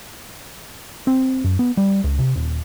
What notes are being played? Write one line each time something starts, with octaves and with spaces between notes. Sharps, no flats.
C4
F#2
B3
G3
C#2
C3
D#1